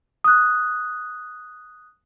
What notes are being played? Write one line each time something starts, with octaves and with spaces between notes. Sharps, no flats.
D#6 F#6